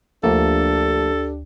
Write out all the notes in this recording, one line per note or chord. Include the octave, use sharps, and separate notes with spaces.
D2 F3 A3 A#3 D4 G4 A4